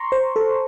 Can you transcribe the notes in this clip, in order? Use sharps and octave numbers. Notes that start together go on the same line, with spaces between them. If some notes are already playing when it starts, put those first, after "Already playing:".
Already playing: A#5 C6 C#6
C5
A4